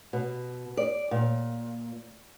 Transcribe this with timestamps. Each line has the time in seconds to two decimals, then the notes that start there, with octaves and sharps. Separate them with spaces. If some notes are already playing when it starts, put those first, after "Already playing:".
0.13 B2
0.77 D5
1.11 A#2